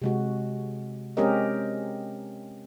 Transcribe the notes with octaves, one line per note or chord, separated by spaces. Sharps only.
C3 G#3 F#4
G#3 C4 C#4 G4 A#4 D#5